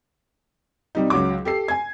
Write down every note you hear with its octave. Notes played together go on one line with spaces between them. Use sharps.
C3 G3 D#4
C#2 F#3 D6
G4 A4 C7
G#5 G#6